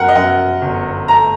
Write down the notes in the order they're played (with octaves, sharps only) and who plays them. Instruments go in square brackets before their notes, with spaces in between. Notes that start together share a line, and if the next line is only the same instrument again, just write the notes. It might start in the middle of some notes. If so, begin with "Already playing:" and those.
Already playing: [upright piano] F#2 A#4 F#5
D#5
F#2 F#5
G1
A3 A#5